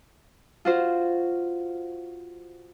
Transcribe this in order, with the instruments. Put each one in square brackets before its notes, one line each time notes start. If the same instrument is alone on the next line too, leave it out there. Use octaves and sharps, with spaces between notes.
[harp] F4 F#4 C5 F5